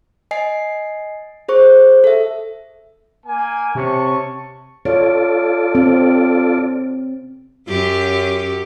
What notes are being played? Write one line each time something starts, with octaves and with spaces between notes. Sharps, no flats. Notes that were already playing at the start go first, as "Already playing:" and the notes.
D#5 G#5 C7
G#4 C5 C#6
A4 E5
A#3 G#5
C3 C#4 A5 C#6
F4 A4 C#5 D5
C4
F#2 F#3 G4